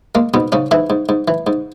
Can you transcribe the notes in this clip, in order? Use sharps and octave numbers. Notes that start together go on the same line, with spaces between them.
G#3 A#3
G#2 B2 B3
G#2 C#3 C#4
G#2 E3 E4
G#2
G#2
E3
G#2